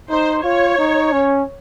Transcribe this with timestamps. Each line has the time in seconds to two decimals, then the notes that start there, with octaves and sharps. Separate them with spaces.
0.10 D#4 C5
0.44 F4 C#5
0.79 D#4
1.13 C#4